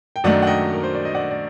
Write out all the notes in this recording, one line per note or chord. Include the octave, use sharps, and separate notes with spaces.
G5
F#2 D#3 F#3 A3 D4 D5 F#5
F#5
D#5 G5
A#4
C5
D5
D#5
D5 F#5
D5